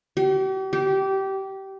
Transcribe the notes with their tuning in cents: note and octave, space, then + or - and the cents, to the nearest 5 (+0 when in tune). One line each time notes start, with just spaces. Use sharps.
G4 -40
G4 -20